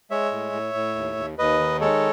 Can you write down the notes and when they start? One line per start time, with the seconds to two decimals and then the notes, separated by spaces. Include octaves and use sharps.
0.11 G#3 C#5 E5
0.32 A2
0.53 A2
0.74 A2
0.95 D#2
1.17 D#2
1.38 D#2 B4 D#5
1.60 D#3
1.81 G#3 A4 C#5